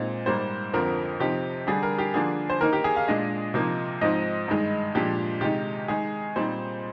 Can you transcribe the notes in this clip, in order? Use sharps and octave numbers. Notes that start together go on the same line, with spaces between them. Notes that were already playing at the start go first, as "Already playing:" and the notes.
Already playing: A#2 G#3 C4 D#4
G#2 G3 A#3 C5
F2 D3 F3 C4 A#4
C3 F3 C4 D#4 G4
D3 G3 D4 G#4
A#4
G4
D3 F3 A#3 D4 G#4
C5
D#3 A#3 D#4 A#4
G4
G#4
F5
A#2 G#3 D4 D#5
C3 F3 A#3 D#4
G#2 F3 C4 D#4 D#5
G2 D#3 G#3
A#2 F3 G#3 D4 G4
C3 D#3 G#3 D#4 G4
D#3 G#3 D#4 G#4
A#2 G3 C4 D#4 C5